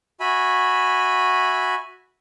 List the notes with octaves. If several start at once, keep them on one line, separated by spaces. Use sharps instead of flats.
F#4 E5 G#5 B5